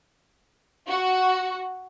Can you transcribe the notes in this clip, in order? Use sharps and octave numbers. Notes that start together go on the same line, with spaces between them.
F#4